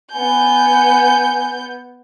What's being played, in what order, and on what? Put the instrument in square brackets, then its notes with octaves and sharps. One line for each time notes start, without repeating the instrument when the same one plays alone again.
[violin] B3 G6 [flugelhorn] G#5